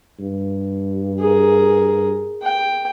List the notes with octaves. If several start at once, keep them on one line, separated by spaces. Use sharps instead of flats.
G2
G#4 A#4
G5